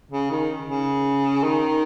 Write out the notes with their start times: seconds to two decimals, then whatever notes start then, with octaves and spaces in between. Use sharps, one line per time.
0.11 C#3
0.31 D#3
0.68 C#3
1.43 D#3